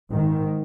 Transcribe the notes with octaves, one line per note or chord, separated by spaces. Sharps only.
G#2 D#3